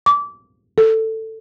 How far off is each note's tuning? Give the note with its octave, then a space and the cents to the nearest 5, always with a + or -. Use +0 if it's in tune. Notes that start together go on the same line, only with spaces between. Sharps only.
D6 -25
A4 +15